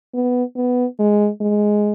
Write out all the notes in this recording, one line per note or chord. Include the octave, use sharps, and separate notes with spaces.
B3
B3
G#3
G#3